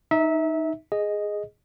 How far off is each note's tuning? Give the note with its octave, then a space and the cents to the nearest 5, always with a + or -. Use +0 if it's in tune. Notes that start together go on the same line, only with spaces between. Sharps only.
D#4 +0 E5 -25
G#4 +0 D#5 +0